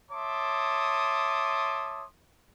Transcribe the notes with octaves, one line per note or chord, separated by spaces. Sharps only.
C#5 E5 A5 C6 D6 D#6